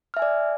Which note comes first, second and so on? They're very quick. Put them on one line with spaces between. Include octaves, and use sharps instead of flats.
F6 E5 G#5 D5